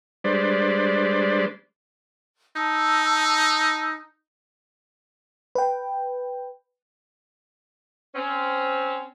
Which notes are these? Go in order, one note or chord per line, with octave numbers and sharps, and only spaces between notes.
G3 G#3 D4 B4 C5 D5
D#4 A5 E6
B4 G5
C4 C#4